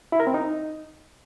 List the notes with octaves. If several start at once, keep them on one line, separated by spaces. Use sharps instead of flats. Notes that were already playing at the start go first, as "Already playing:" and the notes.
E4
A#4
C4
D#4